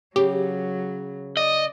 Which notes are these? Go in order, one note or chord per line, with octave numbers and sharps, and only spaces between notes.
C#3 F#3 G4
D5 D#5